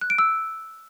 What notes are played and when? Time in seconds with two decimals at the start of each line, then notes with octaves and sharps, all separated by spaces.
0.01 F#6
0.10 D7
0.18 E6